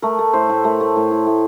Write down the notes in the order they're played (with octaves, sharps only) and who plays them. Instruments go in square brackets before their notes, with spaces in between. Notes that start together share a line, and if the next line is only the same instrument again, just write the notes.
[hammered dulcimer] A3 A#4
A3
A2 C5
A2
A3 A#4
A3
A2
A2
A2